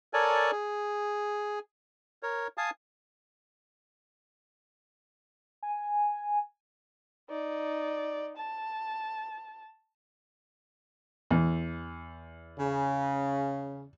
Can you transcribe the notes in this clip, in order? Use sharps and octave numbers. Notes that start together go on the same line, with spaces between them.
A4 A#4 C#5 D5 G#5 A5
G#4
A#4 C#5
F5 G#5 A5 D#6
G#5
D#4 D5
A5
E2
C#3